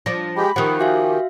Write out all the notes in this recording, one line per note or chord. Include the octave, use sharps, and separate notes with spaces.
F3 D4 A#6
G#3 G4 B5
D#3 F3 G4 F#5 F#6
F#4 E5 F5 G#5